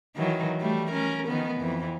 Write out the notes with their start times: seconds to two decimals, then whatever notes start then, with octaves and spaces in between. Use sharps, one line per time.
0.16 D#3 E3 F#3
0.60 G3 A3
0.91 C#4 A#4
1.28 D#3 F3 B3
1.58 F2 E3